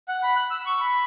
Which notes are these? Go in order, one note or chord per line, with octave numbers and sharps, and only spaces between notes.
F#5
B5
F#6
E6
C#6
B5